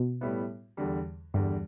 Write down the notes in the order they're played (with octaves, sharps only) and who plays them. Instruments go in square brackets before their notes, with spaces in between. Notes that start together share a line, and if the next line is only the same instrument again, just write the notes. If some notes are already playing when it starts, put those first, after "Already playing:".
Already playing: [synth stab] B2
[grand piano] A2 G3 B3 E4
E2 D3 G3
[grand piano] E2 D3 G3 [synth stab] G2